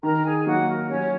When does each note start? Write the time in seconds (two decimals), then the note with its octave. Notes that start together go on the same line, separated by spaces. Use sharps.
0.03 D#3 A#4 A#5
0.24 G#4 G#5
0.46 F#3 A#3 D#4 F#4 F#5
0.68 A#4
0.89 F#3 C#4 C#5